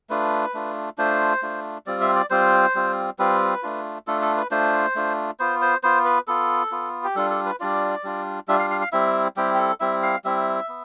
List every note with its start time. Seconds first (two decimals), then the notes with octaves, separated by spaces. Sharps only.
0.10 A3 D4 F4 B4
0.54 A3 D4 F4
0.98 A3 D4 F4 C5
1.42 A3 D4 F4
1.86 G3 C4 F4 D5
2.01 E5
2.16 D5
2.30 G3 C4 F4 C5
2.75 G3 C4 F4
3.19 G3 C4 F4 B4
3.63 A3 D4 F4
4.07 A3 D4 F4 A4
4.22 A4
4.37 B4
4.51 A3 D4 F4 C5
4.96 A3 D4 F4
5.40 B3 F4 C5
5.62 C5
5.83 B3 F4 C5
6.05 B4
6.27 B3 F4 A4
6.72 B3 F4
7.04 G4
7.15 G3 D4 F4 A4
7.30 A4
7.46 B4
7.60 G3 D4 F4 D5
8.04 G3 D4 F4
8.48 G3 D4 F4 E5
8.59 F5
8.70 F5
8.81 F5
8.92 G3 C4 E4 E5
9.36 G3 C4 E4 G4
9.54 G4
9.59 A4
9.80 G3 C4 E4 E5
10.03 F5
10.25 G3 C4 E4 E5
10.69 B3